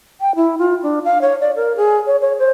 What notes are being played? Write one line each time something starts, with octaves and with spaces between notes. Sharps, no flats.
G5
E4
F4
D4
F5
C#5
D5
A#4
G#4
C#5
C#5
C5